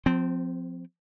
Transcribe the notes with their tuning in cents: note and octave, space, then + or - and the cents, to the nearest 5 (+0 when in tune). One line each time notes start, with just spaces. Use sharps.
F3 +20 C4 -20